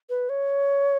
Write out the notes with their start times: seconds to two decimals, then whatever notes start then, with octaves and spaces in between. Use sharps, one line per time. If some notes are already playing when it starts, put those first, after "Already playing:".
0.10 B4
0.29 C#5